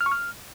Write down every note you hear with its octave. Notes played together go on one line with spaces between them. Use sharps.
F6
C#6
F6